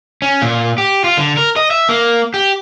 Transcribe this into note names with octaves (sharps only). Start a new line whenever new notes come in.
C#4
A#2
G4
F4
D3
A#4
D#5
E5
A#3
G4